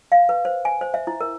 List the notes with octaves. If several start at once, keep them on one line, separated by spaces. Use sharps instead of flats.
F5
B4
C5
G#5
C5
E5
E4
A#4